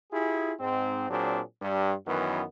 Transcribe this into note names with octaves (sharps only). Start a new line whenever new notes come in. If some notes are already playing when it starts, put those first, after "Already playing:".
E4 F4 G4 G#4
G#2 C4
A#2 F#3 C4 D4 G#4
G2
F#2 D#3 E3 F#3 B3